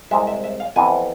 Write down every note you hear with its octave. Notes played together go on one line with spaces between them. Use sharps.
C2 C3 G#3 E5
E5
E5
F5
F2 C3 E3 B3 G#5